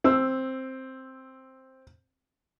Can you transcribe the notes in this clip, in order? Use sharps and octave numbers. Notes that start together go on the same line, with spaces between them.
C4 E6